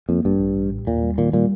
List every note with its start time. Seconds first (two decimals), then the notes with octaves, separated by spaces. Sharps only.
0.09 F2 A#3
0.25 A1 G2
0.40 A1
0.56 A1
0.71 A2
0.87 D#2 A#2
1.03 G3
1.18 A#2 D#3
1.33 A#2 G3